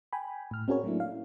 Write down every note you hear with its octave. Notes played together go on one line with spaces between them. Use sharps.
G5 G#5 B5
A2 F6
C4 C#4 F#4 G#4 A#4 C#5
F#3 A3 A#3 D4 E4
F5